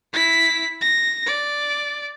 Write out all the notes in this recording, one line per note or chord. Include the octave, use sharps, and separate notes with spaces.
E4 B6
A#6
D5